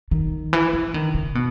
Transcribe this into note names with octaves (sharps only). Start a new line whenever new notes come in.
D#3
E3
E3
D#3
C#3
B2